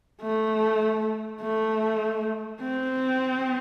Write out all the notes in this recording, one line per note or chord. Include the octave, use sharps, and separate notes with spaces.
A3
A3
C4